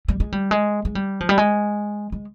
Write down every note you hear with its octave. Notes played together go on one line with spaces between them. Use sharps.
G3
G#3
G3
G#3
G#3
G3
F3
G3
G#3
G#3